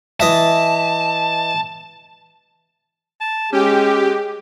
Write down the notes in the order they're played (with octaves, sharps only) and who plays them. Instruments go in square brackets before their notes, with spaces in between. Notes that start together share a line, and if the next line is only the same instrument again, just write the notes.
[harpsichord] E3 D#5 E5 [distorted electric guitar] A5
[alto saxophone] A5
[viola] G#3 [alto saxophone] C#4 [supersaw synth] G4